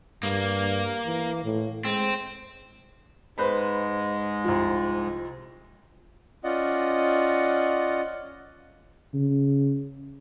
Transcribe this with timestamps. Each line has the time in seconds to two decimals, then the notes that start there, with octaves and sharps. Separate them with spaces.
0.23 G2 A#3
1.06 E3
1.45 A2
1.85 G#3 C4
3.38 G#2 G#3 B4 C5 B5
4.44 C2 F3
6.44 C#4 F4 D5 D#5 F#5
9.14 C#3